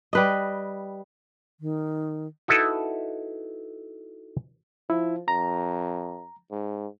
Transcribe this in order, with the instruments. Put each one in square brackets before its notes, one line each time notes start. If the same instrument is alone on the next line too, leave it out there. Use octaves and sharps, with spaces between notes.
[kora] G3 B4 D#5
[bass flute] D#3
[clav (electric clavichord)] D#4 E4 F#4 A4 B4
[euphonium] F3 [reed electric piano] E4
[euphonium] F2 [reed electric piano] A#5
[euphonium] G#2